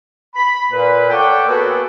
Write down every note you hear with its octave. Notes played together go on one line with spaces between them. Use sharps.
B5
A#2 B4
A4 C#5 D5 F#5 G5
A#3 B3 F#4 G#4 A4